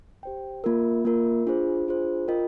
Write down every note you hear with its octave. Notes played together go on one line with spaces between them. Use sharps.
G4 C5 G5
A#3 F4 A#4
A#3 F4 A#4
D4 F4 G#4 C5
D4 F4 G#4 C5
F4 A#4 D#5 G5